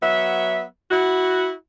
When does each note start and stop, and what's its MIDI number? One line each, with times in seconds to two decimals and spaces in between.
0.01 0.63 54
0.01 0.63 59
0.01 0.63 76
0.91 1.51 64
0.91 1.51 66